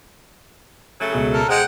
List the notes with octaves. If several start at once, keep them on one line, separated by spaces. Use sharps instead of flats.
C#3 F#3 A3
C#2 B2 G#4
A4 A#4
G#3 G#4 C5 F#5 G5